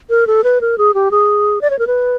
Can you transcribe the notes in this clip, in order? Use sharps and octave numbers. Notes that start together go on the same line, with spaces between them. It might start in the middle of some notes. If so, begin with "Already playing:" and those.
A#4
A4
B4
A#4
G#4
G4
G#4
D5
C#5
A#4
B4